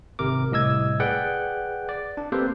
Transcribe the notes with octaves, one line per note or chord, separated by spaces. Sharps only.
G#1 C3 A#4 D6
C2 A2 D#5 E6 G#6
G#4 B4 D5 F#5 G5
D5
D4
A#3 C4 G4 A4 B4 C5